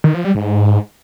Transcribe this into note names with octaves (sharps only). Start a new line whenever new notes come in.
D#3
F3
G3
G#2